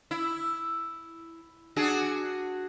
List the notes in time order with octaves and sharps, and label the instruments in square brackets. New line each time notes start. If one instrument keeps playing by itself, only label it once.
[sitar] E4
D4 F#4 G#4